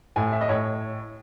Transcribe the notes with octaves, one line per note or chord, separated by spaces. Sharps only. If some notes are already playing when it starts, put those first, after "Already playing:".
A2 G#5
E5
D#5
A2 C#5